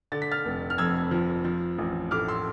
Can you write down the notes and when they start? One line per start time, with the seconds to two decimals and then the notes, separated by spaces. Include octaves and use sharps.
0.12 D3 A6
0.22 B6
0.31 F6 A6
0.45 F1
0.70 F6
0.78 F2 E6 G#6
1.11 F3
1.45 F3
1.78 A1
2.11 A2 D6 F6
2.28 C6 E6